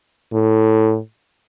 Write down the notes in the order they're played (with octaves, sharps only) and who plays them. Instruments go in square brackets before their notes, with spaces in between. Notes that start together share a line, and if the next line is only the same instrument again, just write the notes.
[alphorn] A2